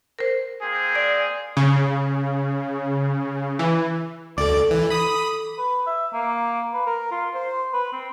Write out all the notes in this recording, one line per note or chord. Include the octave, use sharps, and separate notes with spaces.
A#4 C5
A#3 C4 G#4
D5
C#3
E3
D2 A4 D5 D6
E3
B5 D#6
B4
E5
A#3
B4
A#4
F4
C5
B4
C4